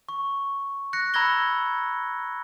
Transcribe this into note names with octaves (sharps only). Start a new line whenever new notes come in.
C#6
F#6 A#6 C#7
A#5 B5 E6 G#6 A#6 G7